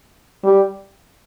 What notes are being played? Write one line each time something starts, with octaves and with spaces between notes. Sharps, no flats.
G3